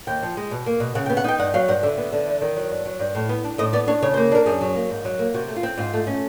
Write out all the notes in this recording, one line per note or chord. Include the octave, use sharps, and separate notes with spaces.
D#2 G5
F3
G#3
B2
A#3
B2
C#3 F#5
G5
B3
F#5
D#4 G5
G2 F#5
F#3 F5
G2 F#5
D3 E5
B3
D3
E2
D#3
F#3
G2
F#3
G2
A2
B3
D4
A2 D#5
B3 D5
D4 C#5
C#3 C#5
C5
A#3
D4 A#4
F#2 G#4
F#3
A#3
G#2
F#3
A#3
C3 F#4
A3
F4
C4
G#2 F4
A3
C#4